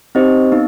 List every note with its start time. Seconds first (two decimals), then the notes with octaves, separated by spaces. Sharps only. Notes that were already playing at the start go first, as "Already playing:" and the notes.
0.15 C4 D#4 G4 C5 D#5
0.52 B3 D#4